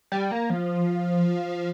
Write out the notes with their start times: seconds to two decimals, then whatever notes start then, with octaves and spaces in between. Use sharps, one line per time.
0.12 G3
0.31 A#3
0.50 F3